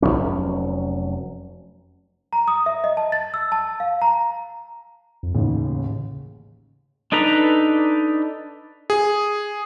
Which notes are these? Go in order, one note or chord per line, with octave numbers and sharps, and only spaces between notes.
F1 F2 F#3 C#4
A#5
D#6
E5
D#5
A5
A6
E6
A5
F5
A#5
F2
A1 D#2 C#3
D4 D#4 A4 B4 A#5
G#4